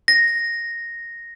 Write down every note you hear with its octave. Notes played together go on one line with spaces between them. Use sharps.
A#6